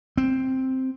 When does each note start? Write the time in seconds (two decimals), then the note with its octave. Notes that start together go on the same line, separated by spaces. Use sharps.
0.18 C4